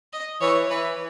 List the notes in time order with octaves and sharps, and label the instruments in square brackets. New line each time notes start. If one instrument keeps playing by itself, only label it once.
[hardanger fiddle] D#5
[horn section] E3 [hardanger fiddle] C#5
[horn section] E3 [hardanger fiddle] B4